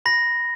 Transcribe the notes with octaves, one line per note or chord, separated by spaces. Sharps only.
B5 A#6